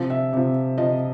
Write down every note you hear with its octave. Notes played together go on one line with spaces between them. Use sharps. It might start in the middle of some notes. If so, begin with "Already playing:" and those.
Already playing: C3 F3
E5
C3 F3
C3 F3 D#5